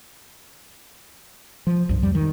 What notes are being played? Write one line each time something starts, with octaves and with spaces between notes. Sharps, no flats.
F3
C2 G2
F2 G3
D#3